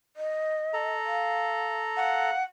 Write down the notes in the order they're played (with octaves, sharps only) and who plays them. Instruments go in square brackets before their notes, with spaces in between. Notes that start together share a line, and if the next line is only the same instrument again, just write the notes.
[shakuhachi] D#5
[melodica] A4 A#5
[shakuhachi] F5
[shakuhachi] F5 [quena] F#5